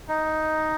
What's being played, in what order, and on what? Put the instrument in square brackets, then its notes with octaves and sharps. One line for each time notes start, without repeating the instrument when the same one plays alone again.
[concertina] D#4